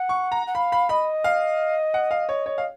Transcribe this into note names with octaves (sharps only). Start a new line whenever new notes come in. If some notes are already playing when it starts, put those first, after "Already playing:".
Already playing: F#5
C#6
A#5
F#5
F5 B5
B5
D#5 B5
F5
F#5
F5
C#5
C#5
F5